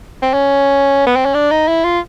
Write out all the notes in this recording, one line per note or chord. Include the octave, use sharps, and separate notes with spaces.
C4
C#4
B3
C4
C#4
D4
D#4
E4
F4